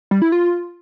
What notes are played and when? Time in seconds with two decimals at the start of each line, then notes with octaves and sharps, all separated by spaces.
0.11 G3
0.22 E4
0.32 F4